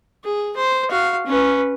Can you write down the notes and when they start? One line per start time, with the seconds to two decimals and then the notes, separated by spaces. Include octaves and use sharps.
0.24 G#4
0.56 C5
0.90 F#4 F5
1.26 C#4 B4